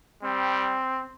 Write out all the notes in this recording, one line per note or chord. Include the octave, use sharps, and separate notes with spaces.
G3 C4